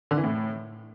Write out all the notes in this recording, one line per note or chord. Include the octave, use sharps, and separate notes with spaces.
D3
E3
A2